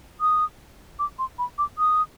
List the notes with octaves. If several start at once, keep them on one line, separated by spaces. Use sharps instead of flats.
D#6
D6
C6
B5
D6
D#6